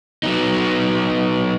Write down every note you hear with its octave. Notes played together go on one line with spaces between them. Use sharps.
F#3 B3 D#4